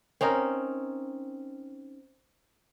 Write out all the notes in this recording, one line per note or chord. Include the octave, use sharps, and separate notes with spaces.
C4 C#4 D#4 A#4